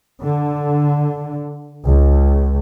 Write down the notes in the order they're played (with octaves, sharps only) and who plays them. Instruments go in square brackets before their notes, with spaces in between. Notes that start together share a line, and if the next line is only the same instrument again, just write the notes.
[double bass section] D3
C#2